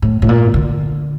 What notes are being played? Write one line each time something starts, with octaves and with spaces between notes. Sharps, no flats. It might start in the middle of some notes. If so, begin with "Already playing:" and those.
A2
A2
A#2
D3